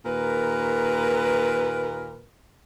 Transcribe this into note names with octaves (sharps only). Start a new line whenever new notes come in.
D#2 A#2 A#4 B4